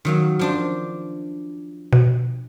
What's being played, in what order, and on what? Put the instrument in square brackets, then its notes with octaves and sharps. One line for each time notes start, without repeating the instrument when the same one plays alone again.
[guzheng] D#3 F#3 F5
F3 D4 C5
[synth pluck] B2